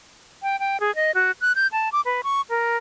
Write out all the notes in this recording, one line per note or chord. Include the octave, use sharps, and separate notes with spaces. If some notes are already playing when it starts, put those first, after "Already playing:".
G5
G5
G#4
D#5
F#4
F#6
G6
A5
D6
B4
C#6
A#4